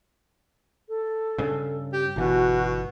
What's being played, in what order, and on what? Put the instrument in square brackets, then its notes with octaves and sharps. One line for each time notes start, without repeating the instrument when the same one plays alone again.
[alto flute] A4
[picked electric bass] G2 C#3
[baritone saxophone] G4
[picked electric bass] G1 E3 [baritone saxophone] B2 [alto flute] F#4